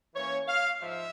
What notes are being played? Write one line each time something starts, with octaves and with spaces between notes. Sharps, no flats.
E3 A#3 C#4 C#5
F5
G#2 F3 E5